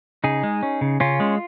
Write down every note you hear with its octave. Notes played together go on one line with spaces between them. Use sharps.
C#3 D#4 G#4
G#3
C#4
C#3
C#3 C#4 F4
G#3